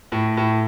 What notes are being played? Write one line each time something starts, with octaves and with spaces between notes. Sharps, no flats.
A2
A2